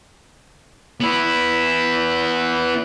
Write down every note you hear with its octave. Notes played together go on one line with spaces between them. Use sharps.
B3 E4